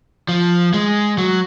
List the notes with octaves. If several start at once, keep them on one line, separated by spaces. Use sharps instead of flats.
F3
G#3
F#3